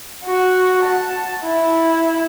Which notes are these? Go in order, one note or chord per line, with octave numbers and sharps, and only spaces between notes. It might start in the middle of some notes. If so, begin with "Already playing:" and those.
F#4
A5
E4